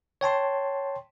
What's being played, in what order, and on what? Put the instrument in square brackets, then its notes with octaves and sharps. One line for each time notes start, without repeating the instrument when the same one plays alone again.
[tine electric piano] C#5 G5 A5 C6